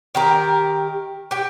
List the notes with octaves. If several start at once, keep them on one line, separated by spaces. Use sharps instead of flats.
D#3 G4 A#4
G4 G5